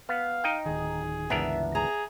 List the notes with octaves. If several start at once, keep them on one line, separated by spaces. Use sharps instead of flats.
B3 F5
D#4 D#5 G5
D1 D#3 G#4
G1 C#2 E3 B3 D4 A#4 E5
G#4 A#5